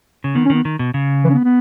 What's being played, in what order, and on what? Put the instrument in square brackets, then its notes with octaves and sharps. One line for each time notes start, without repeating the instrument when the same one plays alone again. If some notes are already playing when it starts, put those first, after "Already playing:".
[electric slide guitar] C#3
[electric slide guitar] D#3 [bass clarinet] B3
[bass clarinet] C#4
[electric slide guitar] D#3 [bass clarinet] B3
[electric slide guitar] D#3
B2
C#3
[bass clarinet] E3
C#4
B3
B3